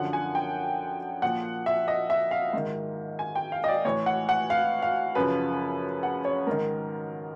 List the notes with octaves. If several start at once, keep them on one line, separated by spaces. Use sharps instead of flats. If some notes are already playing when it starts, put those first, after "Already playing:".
Already playing: F#2 D3 F3 F#5
G#5
G5
A#2 F3 F#5
E5
D#5
E5
F5
G#2 D#3
G#5
G5
F5
D#5
D5
A2 E3 C#5
F#5
F#5
F5
F5
F#2 C#3 F3 B4
F#5
C#5
G#2 D#3 A#4